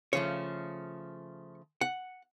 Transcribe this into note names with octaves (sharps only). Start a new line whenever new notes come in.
C#3 F3 A3 C#5
F#5